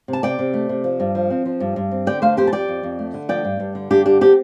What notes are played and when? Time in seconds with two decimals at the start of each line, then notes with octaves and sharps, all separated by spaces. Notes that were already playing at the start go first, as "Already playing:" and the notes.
0.08 C3
0.13 A5
0.23 C3 D5 G5
0.39 C3
0.54 A3
0.69 C3
0.84 F3
1.00 G2
1.15 F3
1.31 C4
1.46 F3
1.60 G2
1.76 G2
1.91 C4
2.07 D3 D5 G5
2.21 A3 C5 F5
2.37 F2 G4 C5
2.47 A5
2.52 F2 D5 G5
2.68 F2
2.83 F2
2.99 A3
3.14 D3
3.29 F3 D5 G5
3.45 G2
3.60 G2
3.75 D3
3.90 G2 D4 G4
4.06 D3 D4 G4
4.21 C4 D4 G4